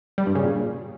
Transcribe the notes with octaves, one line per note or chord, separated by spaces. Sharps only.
G3
G2
C#3
A#2